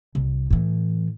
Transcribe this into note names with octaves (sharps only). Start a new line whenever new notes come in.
C2
A2 E3